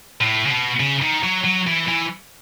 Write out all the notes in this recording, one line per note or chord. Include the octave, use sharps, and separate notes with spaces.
A2
C#3
B2
C#3
D#3
F#3
F#3
E3
E3